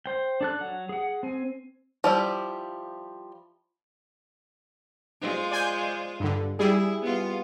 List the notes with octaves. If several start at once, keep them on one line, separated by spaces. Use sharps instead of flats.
C5 G5
D4 A4 F#6
F#3 F#5
G#4 F#5
C4 G#5
F3 G3 E4
G#3 F4 C5
D5 G#5 G6
G2 D3
G3 E4 G#4
B3 F4